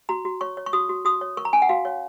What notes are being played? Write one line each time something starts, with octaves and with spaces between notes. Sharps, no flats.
F#4 A#5
F#4
C#5 C#6
C#5
C#6
F#4 D#6
F#4
F#4 D#6
C#5
A#4 C#6
A#5
C#4 G#5
F#5
F#4 F5
C#5